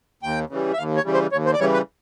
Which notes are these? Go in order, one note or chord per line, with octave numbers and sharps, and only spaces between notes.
D#2 G5
C#3 E3 G3
E5
D#2 F5
C#5
C#3 E3 G3
C5
D#2 C#5
C5
D5
C#3 E3 G3 C#5
B4